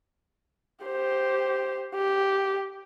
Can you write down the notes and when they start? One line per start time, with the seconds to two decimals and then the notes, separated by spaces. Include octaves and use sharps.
0.85 G4 C5
1.95 G4